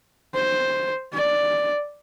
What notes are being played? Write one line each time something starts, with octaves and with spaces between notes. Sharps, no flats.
C5
D5